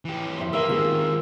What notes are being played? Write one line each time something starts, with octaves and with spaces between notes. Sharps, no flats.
E3 G4
F2 E5 C6
E2 C#3 A#3 G4 A#4 E6
D#3 G#3 C4 F4 G#4